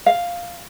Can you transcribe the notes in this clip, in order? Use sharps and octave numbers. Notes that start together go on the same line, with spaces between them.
F5